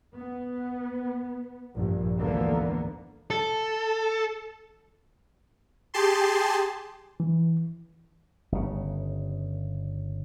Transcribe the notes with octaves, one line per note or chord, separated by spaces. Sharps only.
B3
A#1 G2
D2 G#2 D3 E3 A#3 B3
A4
G4 G#4 A5 C6
E3
G1 C#3